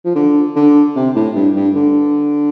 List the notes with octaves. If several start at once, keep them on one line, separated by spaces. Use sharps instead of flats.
F3
D3
D3
C3
A2
G2
G2
D3